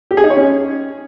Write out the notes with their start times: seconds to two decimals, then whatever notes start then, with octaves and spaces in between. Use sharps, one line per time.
0.11 G4
0.17 G#4
0.24 D#4
0.30 C#5
0.37 C#4